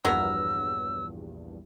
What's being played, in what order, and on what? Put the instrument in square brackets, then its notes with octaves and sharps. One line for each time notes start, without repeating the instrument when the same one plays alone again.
[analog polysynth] A#1 E2 G2 [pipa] F#3 B3 A#4 [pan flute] E6